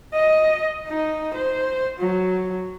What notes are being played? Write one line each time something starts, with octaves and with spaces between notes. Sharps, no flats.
D#5
D#4
C5
F#3